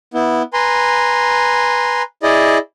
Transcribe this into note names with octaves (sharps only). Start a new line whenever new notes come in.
B3 E4
B4 G#5 A#5 C6
E4 G#4 D5 D#5